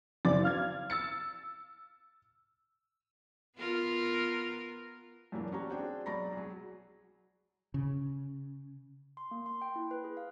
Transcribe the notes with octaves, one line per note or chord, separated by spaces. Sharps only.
F#1 F#2 D5 D6 A6
F5 F6 G#6
E6 A6 C#7
B3 F4 A#4
F#2 A#2 E3 F#3 A#3 D4
C#4 D4 F#4 G4 C#5 A#5
C4 D4 F#4 G#4 G5
B1 D5 A#5 B5 C#6 A#6
F#3 G#4
C#3
C6
A#3
C6
G5
E4
B4
G#4
F5